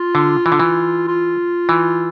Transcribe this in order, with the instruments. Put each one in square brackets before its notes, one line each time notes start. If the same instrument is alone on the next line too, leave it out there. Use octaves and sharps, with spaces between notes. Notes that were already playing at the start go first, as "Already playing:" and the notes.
Already playing: [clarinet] F4
[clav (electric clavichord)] D3
E3
D3
E3
[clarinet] F4
[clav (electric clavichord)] E3